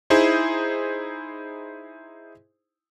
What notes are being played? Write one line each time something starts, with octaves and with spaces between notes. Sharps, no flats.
D#4 E4 G#4 C5